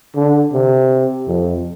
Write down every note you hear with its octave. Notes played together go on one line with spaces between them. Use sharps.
D3
C3
F2